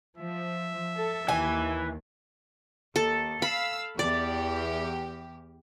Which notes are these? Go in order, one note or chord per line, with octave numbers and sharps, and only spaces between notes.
F3 E5
A4
D#2 E3 G#5
D#2 A4
F5 B5 E6
E2 G4 D5